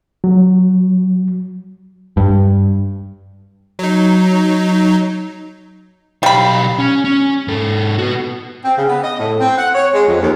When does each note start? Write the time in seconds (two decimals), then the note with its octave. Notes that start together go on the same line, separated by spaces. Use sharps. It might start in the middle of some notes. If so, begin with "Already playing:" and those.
0.24 F#3
2.17 G2
3.79 F#3 D#4
6.23 B1 G3 F5 B5
6.79 C#4
7.04 C#4
7.48 G#2 A4
7.98 F#4 B4
8.64 C4
8.77 C#3
8.88 B3
9.03 D#5
9.19 A2
9.40 C4
9.58 F#5
9.75 C#5
9.93 G#3
10.07 F2
10.22 D#2